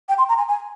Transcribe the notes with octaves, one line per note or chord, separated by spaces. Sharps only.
G5
C6
A#5
G#5
G#5